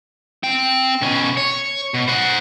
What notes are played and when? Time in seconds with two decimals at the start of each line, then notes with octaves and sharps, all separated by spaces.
0.43 C4 G5
1.02 B2 C#4
1.37 C#5
1.94 B2
2.08 C5 F#5